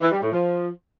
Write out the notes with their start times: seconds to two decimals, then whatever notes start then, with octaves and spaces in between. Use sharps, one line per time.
0.01 E3
0.11 G3
0.22 A2
0.32 F3